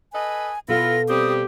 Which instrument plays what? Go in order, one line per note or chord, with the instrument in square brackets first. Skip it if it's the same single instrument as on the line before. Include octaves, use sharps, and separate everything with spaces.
[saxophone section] A4 B4 D#5 [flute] G#5
[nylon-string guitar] B2 A4 F5 [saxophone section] B3 E4 F4 [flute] A#6
[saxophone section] G3 C4 [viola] G4 [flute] D#6